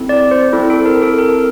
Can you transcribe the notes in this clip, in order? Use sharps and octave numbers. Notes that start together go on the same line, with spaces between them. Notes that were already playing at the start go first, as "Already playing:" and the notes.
Already playing: C4 E4 A4
D5
C5
C4 E4 A4
A4
A#4
A4
A#4